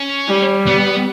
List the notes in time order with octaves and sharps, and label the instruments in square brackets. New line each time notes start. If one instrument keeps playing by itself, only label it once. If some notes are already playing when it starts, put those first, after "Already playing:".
Already playing: [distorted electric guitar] C#4
[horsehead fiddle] G3
[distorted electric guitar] B3